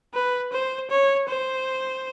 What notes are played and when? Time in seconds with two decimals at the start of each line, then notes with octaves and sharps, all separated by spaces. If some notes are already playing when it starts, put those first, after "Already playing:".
0.14 B4
0.52 C5
0.90 C#5
1.29 C5